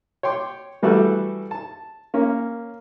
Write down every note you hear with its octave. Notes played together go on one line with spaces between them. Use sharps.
C#5 G5 C6 D6
E3 G3 A3 F#4 A4
A5
A#3 C#4